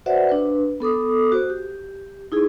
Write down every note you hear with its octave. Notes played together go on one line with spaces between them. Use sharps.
F#4 B4 C5 D5 E5 F#5
D4 B4
B3 A4 D6 D#6
F#4 C5
G4
D#4 E4 G#4